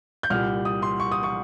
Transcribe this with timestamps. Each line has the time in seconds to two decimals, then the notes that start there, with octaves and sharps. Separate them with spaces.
0.23 G6
0.30 C2 A#2 G3 F6
0.65 D#6
0.82 C6
1.00 C#6
1.12 D#6
1.23 C#6